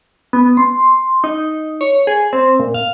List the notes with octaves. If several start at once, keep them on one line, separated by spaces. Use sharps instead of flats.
B3
C6
D#4
C#5
G#4
C4
A#2
F5